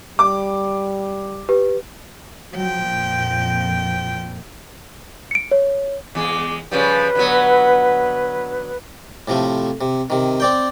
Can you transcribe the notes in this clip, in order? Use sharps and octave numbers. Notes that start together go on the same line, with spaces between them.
G3 D6
G4 B4
F3 F#3 G5
F2 A#2
C#7 D7
C#5
E2 G#3 D6
C#3 F3 G3 B4
D3 F#3 B3
A2 C3 F3 A3
C3
C3 D#3
C4 D5 G5